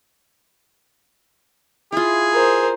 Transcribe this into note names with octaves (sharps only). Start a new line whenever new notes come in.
E4 F4 G#4
A#4 C5